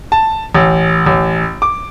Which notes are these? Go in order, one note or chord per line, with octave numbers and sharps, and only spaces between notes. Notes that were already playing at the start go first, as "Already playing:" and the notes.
A5
A1
A1
D6